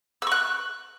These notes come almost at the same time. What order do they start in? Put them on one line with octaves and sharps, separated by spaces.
E6 C#6 F#6